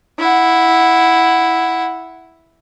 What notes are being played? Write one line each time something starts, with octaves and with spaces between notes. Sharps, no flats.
E4 F#5